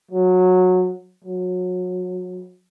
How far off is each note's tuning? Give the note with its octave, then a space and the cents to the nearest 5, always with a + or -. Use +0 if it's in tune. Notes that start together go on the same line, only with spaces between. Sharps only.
F#3 -15
F#3 -30